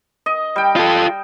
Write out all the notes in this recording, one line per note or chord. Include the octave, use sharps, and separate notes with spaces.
D#5
G3 G5
F4 A4